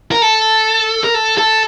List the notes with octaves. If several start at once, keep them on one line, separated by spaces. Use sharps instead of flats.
A#4
A4
A#4
A4
A4